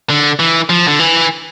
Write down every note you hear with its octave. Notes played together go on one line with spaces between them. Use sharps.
D3
E3
F3
D3
E3